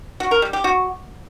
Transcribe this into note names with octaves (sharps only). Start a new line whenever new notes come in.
F#4
A#4
G3
G4
F#4